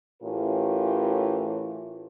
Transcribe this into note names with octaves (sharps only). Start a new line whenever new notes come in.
A2 E3 C#4 F4 G4 A#4